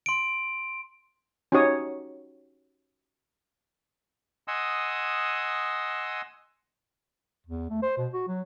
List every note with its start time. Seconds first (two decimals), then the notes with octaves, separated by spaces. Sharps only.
0.06 C6 D7
1.52 C#4 D#4 F#4 G4 C#5 D#6
4.48 D#5 F#5 G#5 C6 D#6 E6
7.46 E2
7.70 A3
7.82 C5
7.98 B2
8.13 F#4
8.28 F#3